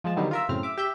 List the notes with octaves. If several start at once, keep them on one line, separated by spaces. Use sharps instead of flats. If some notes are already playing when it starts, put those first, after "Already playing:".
F3 G#3 A5
D3 D#3 F#3 G3 B3 D#4
F4 A#4 E5
F#2 A2 C#3 C4 F6
E5 D6
G4 E5 G6